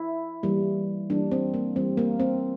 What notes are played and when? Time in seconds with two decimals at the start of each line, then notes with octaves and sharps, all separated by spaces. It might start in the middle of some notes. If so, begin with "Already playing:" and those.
Already playing: E4
0.43 E3 G3 A#3
1.10 E3 G3 A#3 D4
1.31 C4
1.54 A#3
1.76 E3 G3 A#3 C4
1.97 A#3
2.20 C4